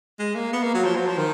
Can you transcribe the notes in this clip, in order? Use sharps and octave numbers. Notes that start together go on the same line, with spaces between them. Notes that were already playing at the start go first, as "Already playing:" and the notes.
G#3
A#3
B3
A#3
F#3
F3
F#3
F3
D#3